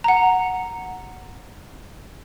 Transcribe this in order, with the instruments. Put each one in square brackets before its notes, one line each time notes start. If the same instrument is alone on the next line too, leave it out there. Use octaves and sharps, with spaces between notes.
[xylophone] F#5 A#5